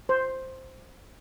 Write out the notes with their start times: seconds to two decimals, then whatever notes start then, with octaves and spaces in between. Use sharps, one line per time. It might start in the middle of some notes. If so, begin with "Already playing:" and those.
0.09 C5